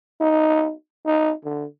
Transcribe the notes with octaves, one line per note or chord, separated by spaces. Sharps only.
D#4
D#4
D3